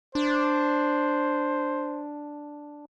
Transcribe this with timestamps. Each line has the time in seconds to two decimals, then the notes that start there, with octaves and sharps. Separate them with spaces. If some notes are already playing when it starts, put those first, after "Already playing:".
0.15 D4 C5